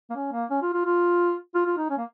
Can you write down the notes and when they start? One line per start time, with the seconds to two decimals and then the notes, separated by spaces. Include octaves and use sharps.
0.10 A#3
0.15 C#4
0.32 A#3
0.50 C#4
0.62 F4
0.73 F4
0.85 F4
1.55 F4
1.66 F4
1.77 D#4
1.90 C#4
1.98 A#3